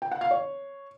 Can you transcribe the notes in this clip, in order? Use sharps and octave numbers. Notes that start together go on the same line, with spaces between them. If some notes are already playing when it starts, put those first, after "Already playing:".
G5
F#5
F5
C#5